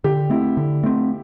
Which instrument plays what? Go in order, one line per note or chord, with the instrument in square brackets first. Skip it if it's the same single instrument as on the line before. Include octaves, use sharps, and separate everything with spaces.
[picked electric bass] D3 [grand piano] G4
[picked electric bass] A3 C4 [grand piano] E4
[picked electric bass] D3
A3 C4